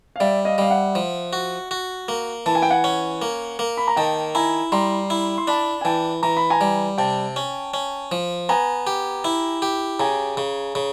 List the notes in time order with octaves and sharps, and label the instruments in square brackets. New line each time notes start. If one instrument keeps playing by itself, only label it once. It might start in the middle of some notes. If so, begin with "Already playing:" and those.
[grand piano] F5
[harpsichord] G3 [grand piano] D5 E5
[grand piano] D#5 F5
[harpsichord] G3 [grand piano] F5
[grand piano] E5 F#5
[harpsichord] F3
F#4
F#4
A#3
[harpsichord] E3 [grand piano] A5
[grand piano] G#5
G5
F#5 G#5
[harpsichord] C#4
A#3
A#3
[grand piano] B5
A#5
[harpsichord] D#3 [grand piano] G5 A5
[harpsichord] E4 [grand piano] G#5 A#5
[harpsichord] G3 [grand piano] A#5 C6
[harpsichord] E4
[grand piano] C6
[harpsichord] D4 [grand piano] A5 B5
[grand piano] G#5
[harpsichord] E3 [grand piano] G5 A5
[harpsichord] E3 [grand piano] A#5
[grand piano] B5
G#5 A#5
[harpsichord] G3
[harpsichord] C3 [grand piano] G5 A5
[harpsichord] C#4
C#4
F3
[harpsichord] B3 [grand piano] G#5 A#5
[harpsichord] G4
E4
G4
[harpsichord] C#3 [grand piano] G#5 A#5
[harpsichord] C#3
C#3